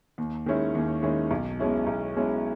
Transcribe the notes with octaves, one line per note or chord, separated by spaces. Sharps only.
D#2
D#3 G#3 C#4 E4
D#2
D#3 G#3 C#4 E4
B1
B2 G#3 C#4 E4
B1
B2 G#3 C#4 E4